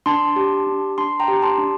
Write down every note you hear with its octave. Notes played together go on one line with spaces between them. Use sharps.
D4 A5 C6
G4
D4
D4 A5 C6
G5 A#5
G4
A5 C6
D4